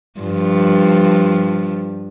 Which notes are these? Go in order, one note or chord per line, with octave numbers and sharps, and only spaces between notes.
G2 F3